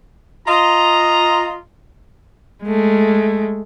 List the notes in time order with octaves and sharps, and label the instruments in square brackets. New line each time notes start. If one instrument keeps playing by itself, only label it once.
[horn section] F4 D#5 A#5
[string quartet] G#3 A3